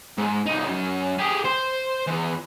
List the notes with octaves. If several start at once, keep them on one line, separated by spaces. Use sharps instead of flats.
G#2
C2 D#4
F#2
G4 G#4
C5
E2 E3